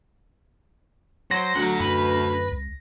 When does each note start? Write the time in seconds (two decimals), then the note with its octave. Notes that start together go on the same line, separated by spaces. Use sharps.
1.31 F#3 C5 A#6
1.56 D2 F#3 F#5
1.80 F#2 B4
2.51 C#2